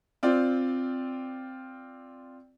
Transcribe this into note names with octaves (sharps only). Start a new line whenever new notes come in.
C4 F4 D5